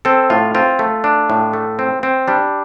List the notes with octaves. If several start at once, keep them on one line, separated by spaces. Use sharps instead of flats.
C4 A4
A2 F4
C4 F4
A3
D4
A2
A3
C4
C4
G3 D4